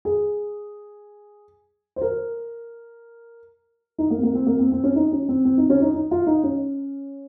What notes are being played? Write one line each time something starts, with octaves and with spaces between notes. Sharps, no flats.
G#4
C5
A#4
D#4
A#3
C4
A#3
C4
A#3
C4
C4
C#4
D#4
C#4
C4
C4
D#4
C#4
D#4
D#4
F4
D#4
C#4